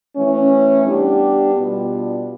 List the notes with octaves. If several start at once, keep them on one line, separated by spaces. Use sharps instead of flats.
E3 A3 C#4
G3 B3 D4 G4
B2 G3 B3 D4 F4